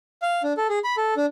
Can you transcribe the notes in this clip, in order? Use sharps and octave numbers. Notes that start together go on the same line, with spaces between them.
F5
D4
A4
G#4
B5
A4
D4